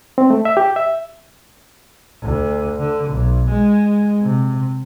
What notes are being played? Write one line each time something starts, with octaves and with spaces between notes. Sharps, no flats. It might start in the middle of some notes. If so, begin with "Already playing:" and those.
C4
A3
E5
G4
E5
D2
D3
B1
G#3
C3